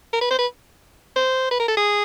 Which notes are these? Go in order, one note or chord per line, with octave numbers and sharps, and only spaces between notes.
A#4
B4
C5
B4
C5
B4
A#4
A4
G#4